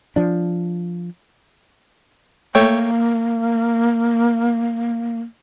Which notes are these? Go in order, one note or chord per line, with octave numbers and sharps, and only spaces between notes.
F3 D4
A3 A#3 C#5 G5